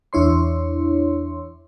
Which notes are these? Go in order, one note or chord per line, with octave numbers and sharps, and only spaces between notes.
E2 D4 E4 C#5 C6